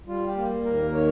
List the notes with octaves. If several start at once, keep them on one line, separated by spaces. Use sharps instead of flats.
G3 F4
G4
A#3
D#2 A#4
D#3 C#5